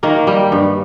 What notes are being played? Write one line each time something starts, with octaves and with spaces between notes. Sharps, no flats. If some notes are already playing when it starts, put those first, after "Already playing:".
D#3 A#3 A#4
G3
G2